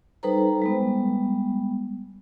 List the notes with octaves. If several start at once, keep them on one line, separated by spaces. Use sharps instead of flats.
G3 D#4 A4 B4 C5 A#5
G3 G#3 B3